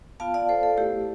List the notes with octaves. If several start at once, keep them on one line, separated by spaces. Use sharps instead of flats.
B3 F4 F5 A5
D5 F5
A4 C5
A4
A3 E4 G4